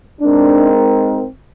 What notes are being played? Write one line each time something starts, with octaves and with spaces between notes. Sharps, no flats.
G#3 C4 D4 D#4 A#4